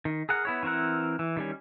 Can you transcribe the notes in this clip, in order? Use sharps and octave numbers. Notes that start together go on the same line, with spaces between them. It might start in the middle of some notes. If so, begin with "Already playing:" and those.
D#3
G#4 A#4 F#5
B3 E4 C#5
E3 C4 E4 A#4 F#5
E3
D#3 G3 C#4